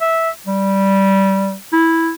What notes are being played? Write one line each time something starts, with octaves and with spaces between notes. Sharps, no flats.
E5
G3
E4